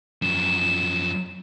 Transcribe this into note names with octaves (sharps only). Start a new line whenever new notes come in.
F#2 F3 E7